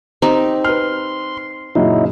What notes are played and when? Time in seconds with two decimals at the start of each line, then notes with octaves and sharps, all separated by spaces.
0.22 C4 D#4 G4
0.64 B4 C6 F6
1.75 F#2 A#2 C#3 F#3 D#4 E4